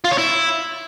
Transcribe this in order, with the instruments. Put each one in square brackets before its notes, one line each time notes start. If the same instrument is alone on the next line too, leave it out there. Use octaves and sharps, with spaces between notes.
[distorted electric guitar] F4
C#5
E4